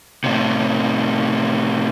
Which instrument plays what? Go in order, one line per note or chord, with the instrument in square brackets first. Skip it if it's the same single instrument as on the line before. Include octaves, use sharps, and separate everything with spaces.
[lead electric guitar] A2 C3